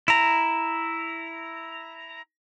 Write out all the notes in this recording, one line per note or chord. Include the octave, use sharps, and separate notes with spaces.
E4 A#5